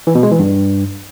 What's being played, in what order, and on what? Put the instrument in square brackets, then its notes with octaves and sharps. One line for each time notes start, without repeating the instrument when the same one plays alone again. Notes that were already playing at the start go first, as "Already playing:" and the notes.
[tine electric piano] E3
B2
G#3
E3
G2